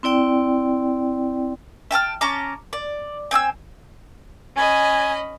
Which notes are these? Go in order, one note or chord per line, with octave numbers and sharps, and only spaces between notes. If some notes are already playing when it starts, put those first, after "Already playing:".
C4 E4 D5 G5
E5 G5 A5 F6
C#4 A5 A#5 D6
D5
C4 G#5 D#6 E6
C#4 D#5 G#5 B5